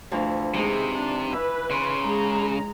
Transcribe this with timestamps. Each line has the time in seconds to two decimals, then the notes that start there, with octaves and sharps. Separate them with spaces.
0.11 D2 E3 F3
0.54 C3 E3 G#3 D#4
0.92 D4
1.32 E3 B4 E5
1.71 C#3 C6
2.03 G#3 A#5